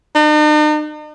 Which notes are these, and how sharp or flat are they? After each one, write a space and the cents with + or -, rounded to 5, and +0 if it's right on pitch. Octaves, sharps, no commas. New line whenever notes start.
D#4 -45